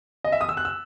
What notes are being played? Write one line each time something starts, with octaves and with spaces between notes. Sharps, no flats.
D#5
E5
D#6
E6
F#6
E6